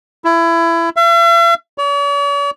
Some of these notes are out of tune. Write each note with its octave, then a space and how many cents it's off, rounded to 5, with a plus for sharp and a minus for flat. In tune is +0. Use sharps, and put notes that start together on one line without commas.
E4 +25
E5 +45
C#5 +45